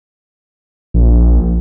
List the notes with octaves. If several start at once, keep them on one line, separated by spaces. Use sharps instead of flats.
A#1